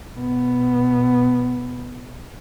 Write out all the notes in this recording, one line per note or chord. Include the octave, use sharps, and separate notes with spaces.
B2 B3